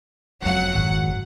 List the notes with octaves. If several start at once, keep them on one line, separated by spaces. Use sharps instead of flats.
F#1 F2 F#3 F#5
G#1